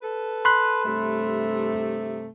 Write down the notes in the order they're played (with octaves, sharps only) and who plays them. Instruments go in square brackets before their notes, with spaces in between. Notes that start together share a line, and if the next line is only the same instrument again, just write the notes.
[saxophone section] A4 B4
[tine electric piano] B5 C6 F#6
[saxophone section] G2 C3 A3